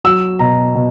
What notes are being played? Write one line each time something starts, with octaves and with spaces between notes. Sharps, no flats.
F#3 E6
B2 A#5
B2